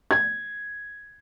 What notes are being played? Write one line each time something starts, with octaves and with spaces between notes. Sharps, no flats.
G#6